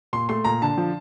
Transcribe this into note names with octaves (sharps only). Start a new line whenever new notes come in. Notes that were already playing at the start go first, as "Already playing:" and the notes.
A#2 C6
A3 C6
A#2 A#5
D3 A5
F3